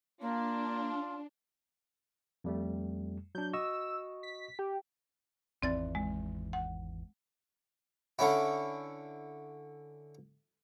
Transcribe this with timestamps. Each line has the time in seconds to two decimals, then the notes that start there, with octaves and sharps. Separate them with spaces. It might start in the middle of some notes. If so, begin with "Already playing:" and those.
0.21 A#3 D4 F4
2.44 F2 G3 A3
3.35 F#3 D4 G6
3.53 F#4 D#5 C#6 E6
4.23 B6
4.59 G4
5.62 G#1 E2 C4 D5 A6
5.95 G#3
6.53 F#5
8.19 D3 C#4 E4